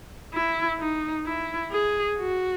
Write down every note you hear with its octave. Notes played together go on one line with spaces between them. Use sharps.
E4
D#4
E4
G#4
F#4